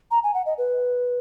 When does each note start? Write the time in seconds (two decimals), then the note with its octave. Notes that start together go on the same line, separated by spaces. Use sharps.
0.11 A#5
0.24 G#5
0.34 F#5
0.46 D#5
0.58 B4